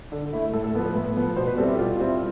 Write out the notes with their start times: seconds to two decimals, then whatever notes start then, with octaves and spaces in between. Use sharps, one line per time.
0.12 D3
0.33 A3 E4
0.54 A2 A4
0.64 A4
0.75 F3 B3 A4
0.85 B4
0.95 A2
1.17 F3 B3
1.36 B2 C5
1.47 B4
1.57 G3 C4 E4 A4
1.68 G4
1.78 B2 F4
1.99 G3 C4 E4